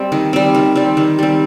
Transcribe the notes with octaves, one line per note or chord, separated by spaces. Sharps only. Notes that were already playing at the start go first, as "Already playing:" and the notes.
Already playing: G3 C4
D#3
G3 C4
D#3
G3 C4
D#3
G3 C4